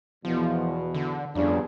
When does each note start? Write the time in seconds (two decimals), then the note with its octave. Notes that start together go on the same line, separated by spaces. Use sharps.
0.25 E2 B2 F3
0.94 D3
1.35 G1 F2 C#3 D4